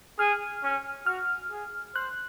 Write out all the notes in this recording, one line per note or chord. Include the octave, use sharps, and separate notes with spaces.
G#4 F6
C#4
F#4 F6
G#4
C5 F#6